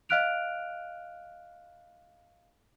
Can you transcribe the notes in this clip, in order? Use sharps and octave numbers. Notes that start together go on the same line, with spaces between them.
D#5 F5 F6 F#6 D7 F7